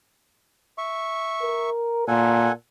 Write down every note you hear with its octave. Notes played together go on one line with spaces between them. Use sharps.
E5 C#6
A#4
A#2 A4 F#5 G#5